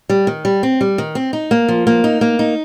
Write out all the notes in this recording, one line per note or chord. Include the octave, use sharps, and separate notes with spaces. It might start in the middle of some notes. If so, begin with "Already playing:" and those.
G3
D#3
G3
C4
G3
D#3
C4
D#4
A#3
F3
A#3
D#4
A#3
D#4